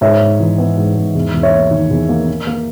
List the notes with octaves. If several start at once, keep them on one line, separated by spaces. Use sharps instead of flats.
G#2 C#5 E5
G#2
E3
B3
G#2
G#2
E2
E2
C#5 E5
A#3
D#3
E2
A#3
A#3
A#3